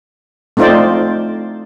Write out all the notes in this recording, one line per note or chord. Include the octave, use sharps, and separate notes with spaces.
A3 C4 D#4 F4 C5 D5